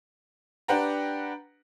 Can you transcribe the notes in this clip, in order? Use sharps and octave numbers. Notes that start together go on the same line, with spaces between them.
D4 G4 B4 F#5 G5 A#5